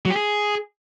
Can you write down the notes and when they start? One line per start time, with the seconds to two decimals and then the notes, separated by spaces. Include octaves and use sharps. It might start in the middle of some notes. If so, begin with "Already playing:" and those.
0.05 F#3
0.11 G4
0.16 G#4